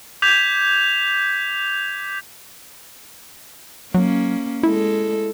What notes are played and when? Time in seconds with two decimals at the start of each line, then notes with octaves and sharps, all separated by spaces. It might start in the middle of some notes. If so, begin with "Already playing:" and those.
0.22 D6 G6 G#6 B6 F7
3.94 F#3 A#3 C#4
4.63 G#3 E4 A4